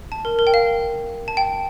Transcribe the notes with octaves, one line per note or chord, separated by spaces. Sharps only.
A5
A#4
A#4
G5
F5
A5
G5